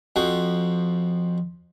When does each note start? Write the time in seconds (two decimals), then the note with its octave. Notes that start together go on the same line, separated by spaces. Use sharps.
0.16 F2 F3 F#4